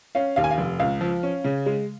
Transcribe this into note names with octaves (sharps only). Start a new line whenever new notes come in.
C#4 F5
D#2 F5
G#5
F5
F1
C#2 F5
F3
C#4
C#3
G#3